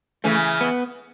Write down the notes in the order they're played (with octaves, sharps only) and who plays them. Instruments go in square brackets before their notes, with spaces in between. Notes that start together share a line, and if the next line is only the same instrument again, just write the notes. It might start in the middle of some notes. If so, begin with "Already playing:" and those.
[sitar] C#3 E3 [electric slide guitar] A3
[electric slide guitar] B3